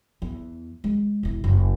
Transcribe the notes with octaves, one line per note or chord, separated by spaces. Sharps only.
E2
G#3
E1 E4
F#1